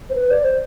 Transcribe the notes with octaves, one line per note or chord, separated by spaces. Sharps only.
C5
B4
D5
C5